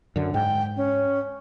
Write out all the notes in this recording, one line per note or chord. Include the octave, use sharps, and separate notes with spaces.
F#2 D3
G#2 G5
C#4